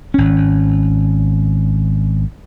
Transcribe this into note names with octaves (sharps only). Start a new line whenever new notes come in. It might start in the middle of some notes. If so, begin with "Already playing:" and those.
G#1 C#4